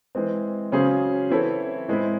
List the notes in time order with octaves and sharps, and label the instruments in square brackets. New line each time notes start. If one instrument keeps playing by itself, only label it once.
[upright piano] E3 G#3 C4
C#3 F#3 C#4 G#4 C5
E3 C4 E4 A4 C#5
A2 G#3 C4 E4